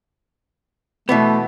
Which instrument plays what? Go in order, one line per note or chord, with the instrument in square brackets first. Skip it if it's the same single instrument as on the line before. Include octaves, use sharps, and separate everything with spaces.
[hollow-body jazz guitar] B2 E3 B3 [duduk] A3